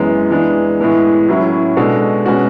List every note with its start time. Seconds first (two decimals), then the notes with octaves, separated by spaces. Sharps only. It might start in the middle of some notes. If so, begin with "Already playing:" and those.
Already playing: F#2 E3 G#3 B3
0.31 E3 G#3 B3 D4
0.80 A2 E3 G#3 B3
1.28 A2 F#3 C#4 E4
1.76 B2 G#3 D4 F#4 A4
2.26 B2 G#3 C#4 F#4